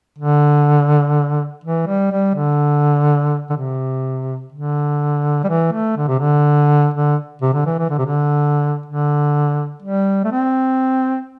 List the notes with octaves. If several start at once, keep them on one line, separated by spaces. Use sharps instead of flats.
D3
E3
G3
G3
D3
D3
C3
D3
G3
E3
A3
D3
C3
D3
D3
C3
D3
E3
E3
D3
C3
D3
D3
G3
A3
C4